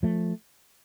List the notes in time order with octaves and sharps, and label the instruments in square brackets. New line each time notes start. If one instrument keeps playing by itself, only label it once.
[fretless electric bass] F3 A3